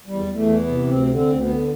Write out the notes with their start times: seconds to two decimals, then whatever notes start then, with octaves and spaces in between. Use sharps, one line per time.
0.06 E2 G3
0.26 E2
0.32 A3
0.46 E3
0.60 B3
0.67 C3
0.86 D2 C4
1.07 D3
1.14 C4
1.26 D2
1.40 B3
1.47 D3